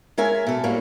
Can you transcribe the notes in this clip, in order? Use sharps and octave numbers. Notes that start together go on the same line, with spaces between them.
G#3 C#4 A#4 E5 G#5
B2 A4
A2 G3 A#3